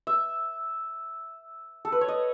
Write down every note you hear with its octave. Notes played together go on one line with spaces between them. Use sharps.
E5
A4
B4
C#5
D#5